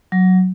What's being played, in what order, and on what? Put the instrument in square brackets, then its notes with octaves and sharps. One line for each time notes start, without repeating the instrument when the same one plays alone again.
[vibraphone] F#3